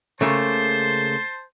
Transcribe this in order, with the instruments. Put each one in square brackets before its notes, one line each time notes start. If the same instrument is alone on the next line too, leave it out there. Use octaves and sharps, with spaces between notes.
[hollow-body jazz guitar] C#3 A3 A#3 [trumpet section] C5 A5 C6